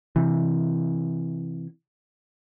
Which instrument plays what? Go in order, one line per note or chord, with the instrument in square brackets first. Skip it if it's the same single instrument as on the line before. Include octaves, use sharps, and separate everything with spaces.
[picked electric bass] C3 E3